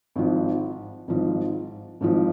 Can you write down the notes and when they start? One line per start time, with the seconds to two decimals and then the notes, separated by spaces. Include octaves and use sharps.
0.16 G#1 G#2 F3
1.08 G#1 G#2 F3
2.01 G#1 G#2 F3